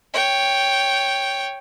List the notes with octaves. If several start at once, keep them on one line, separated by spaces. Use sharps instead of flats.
C#5 G5